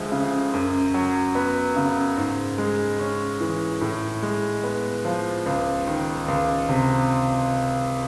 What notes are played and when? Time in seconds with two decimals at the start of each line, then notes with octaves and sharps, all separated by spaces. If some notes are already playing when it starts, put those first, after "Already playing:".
Already playing: D2 F3 G#3
0.12 C#3
0.53 F#2
0.94 F#3
1.35 B3
1.76 C#3
2.17 G#2
2.58 G#3
3.00 C#4
3.41 E3
3.81 A2
4.23 G#3
4.64 B3
5.05 F3
5.46 C#2
5.87 D#3
6.28 C#2
6.69 C3